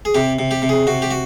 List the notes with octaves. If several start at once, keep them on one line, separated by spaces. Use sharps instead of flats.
G#4
C3 G4
C3
G4
C3
G#4
C3 F#4
G4
F#4